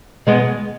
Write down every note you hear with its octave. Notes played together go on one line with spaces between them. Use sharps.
B2 G#3 B3